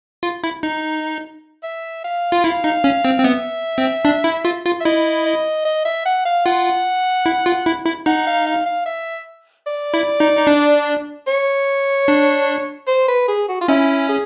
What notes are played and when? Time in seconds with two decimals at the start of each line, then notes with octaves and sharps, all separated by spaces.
0.23 F4
0.44 E4
0.63 D#4
1.63 E5
2.04 F5
2.32 F4
2.44 E4 F5
2.64 D#4
2.84 C#4
3.05 C4
3.18 C4
3.24 B3 E5
3.78 C4
4.05 D4
4.24 E4
4.45 F4
4.65 F4
4.81 E5
4.85 E4 D#5
5.26 D#5
5.65 D#5
5.85 E5
6.06 F#5
6.25 F5
6.46 F4 F#5
7.26 E4
7.46 F4
7.66 E4
7.86 E4
8.06 D#4 F#5
8.27 F5
8.46 F5
8.66 F5
8.86 E5
9.67 D5
9.94 E4
10.20 D#4
10.37 D#4
10.47 D4
11.27 C#5
12.08 D4
12.88 C5
13.08 B4
13.28 G#4
13.49 F#4
13.61 F4
13.68 C#4 E4
14.09 G#4